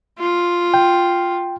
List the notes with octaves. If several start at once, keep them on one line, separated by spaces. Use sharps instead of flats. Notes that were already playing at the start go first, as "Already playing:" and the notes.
F4
G5